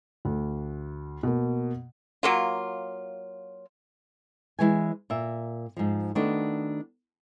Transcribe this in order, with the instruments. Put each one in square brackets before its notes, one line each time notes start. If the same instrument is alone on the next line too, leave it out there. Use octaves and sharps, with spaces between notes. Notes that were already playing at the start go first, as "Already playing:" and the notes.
[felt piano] D2
B2 A#3
[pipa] F#3 A#3 F4
[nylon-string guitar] E3 F3 G#3 B4 C#5 G#5
A#2 A#4 E5
G#2 F3
D#3 A3 B3 D4 F#4